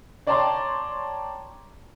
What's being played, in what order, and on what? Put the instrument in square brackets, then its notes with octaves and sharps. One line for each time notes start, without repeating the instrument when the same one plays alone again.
[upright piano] C#5 D5 G5 A5 A#5 C6